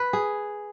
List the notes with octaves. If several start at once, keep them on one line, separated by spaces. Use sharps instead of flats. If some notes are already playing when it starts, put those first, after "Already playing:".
Already playing: B4
G#4